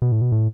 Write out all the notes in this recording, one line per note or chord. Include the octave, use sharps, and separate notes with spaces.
B2
A2
B2
A2